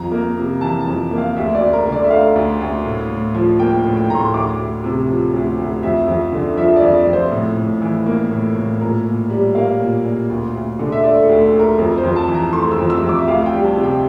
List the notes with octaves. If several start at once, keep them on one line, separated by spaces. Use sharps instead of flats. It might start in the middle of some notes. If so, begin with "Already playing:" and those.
Already playing: F2 A#5
A#3
C3
E3 A5
A5
F2
A#3
F5
D2 E5
D5
D2
A#4
D3
D5
E5
A3 F5
D2
D2
A2
A2
F3
A#3 G5
A2
G5
A2 A#5
C6
D2 D6
D2
C3
F3
D2
D2
F2 E5
F2
D3
F3 E5
D5
F2
D5
F2
C5
A2
A2
E3
A#3
A2
A2
A#2 A#4
A#2
G3
A#3 F5
A#2
A#2
D2
D2
D3
E5
A3 D5
A4
D2
A4
D2
A#4
F2 A#4
C5
F2
A5
E3
A#5
A3 C6
E6
F2
E6
F2
D6
E5
D2 F5
G5
G3
A5
C3
G5